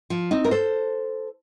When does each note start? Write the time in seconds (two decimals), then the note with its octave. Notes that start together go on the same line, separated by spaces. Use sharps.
0.10 F3
0.31 C4 D#4
0.44 A#4
0.51 A4 C5